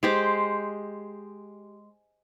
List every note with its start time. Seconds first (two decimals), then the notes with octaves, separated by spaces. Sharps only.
0.03 G#3 G4 C5